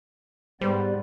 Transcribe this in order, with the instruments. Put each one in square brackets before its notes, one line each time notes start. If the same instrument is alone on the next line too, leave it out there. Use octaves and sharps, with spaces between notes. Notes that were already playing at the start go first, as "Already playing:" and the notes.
[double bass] G#2 [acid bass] G3 [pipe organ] B3 D5 [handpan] B4 C5